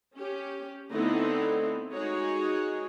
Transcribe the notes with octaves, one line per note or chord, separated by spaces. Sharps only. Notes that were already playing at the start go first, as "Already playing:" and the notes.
C#4 G4
D3 A3 B3 C4 D#4 E4
G#3 D#4 F#4 G#4 C#5